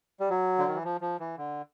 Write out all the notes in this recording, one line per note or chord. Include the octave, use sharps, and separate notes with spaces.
G3
F#3
D3
D#3
E3
F3
F3
E3
D3